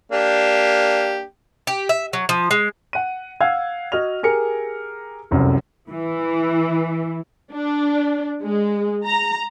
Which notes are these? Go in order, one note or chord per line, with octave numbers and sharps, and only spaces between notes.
A#3 D4 G4
G4
E5
F#3
F3
G#3
F#5 D#7
F5 F#5 E6 G#6
F#4 D#5 F6 F7
G4 G#4 A#4 C#7
F1 C2 F#2
E3
D4
G#3
A#5